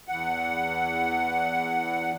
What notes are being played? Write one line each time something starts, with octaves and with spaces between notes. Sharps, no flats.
E2 F#5